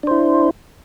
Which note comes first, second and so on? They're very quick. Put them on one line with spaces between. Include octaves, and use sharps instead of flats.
D4 C5 E4